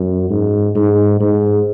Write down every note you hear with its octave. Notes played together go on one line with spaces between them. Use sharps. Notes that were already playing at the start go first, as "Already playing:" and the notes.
Already playing: F#2
G#2
G#2
G#2